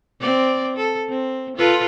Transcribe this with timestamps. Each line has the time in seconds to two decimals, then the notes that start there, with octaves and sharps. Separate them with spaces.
0.21 C4 D5
0.77 A4
1.09 C4
1.57 F4 A4 B4